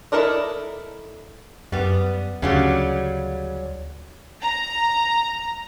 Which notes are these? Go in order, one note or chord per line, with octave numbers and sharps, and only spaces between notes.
E4 A4 A#4 D5 D#5
F#2 G3 B3
D2 C#3 F#3 G3
A#5